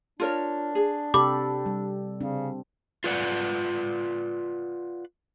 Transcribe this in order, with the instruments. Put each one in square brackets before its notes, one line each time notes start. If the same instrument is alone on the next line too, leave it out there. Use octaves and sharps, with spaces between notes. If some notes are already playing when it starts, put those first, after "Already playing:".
[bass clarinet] D4 [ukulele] F4 A#4 C#5
[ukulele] G#4
[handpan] C3 G4 A4 [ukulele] B5 [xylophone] D6
[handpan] G3
[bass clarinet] C#3 [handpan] C4 D4
[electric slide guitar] F4 B4 D5 F#5